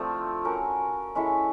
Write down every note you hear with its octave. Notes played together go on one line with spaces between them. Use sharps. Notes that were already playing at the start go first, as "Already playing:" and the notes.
Already playing: F3 A3 C4 D4 F4
C#4 F#4 A#4
G#3 C#4 E4 A4